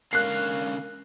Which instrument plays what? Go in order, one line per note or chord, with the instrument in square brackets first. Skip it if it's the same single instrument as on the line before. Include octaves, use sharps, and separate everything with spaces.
[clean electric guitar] G#2 A#3 [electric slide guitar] D3 C#4 F5 [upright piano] F#6 C7